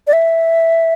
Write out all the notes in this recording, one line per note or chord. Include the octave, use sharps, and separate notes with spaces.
D5
E5